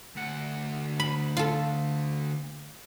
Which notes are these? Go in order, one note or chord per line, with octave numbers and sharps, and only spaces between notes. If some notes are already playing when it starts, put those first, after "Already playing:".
D2 F#5
B5
F4 A4